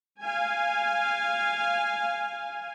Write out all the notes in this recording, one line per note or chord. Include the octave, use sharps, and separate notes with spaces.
F5 G#5